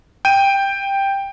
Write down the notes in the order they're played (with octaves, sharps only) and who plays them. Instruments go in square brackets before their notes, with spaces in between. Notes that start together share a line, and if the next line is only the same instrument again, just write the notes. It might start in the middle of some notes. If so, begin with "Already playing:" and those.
[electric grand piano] G5 D#7